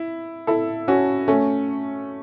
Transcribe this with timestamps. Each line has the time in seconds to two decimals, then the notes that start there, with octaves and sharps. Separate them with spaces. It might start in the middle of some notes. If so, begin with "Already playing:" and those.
Already playing: E4
0.47 E4 A4
0.88 C#4 F#4
1.28 A3 C#4